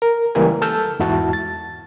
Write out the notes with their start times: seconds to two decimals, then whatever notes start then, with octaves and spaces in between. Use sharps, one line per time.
0.02 A#4
0.35 C#2 E3 G3 A#3 A#4 G#5
0.61 A4 A5 E6 F6 G6
0.99 E2 G#2 E4 F#4 A5
1.33 A6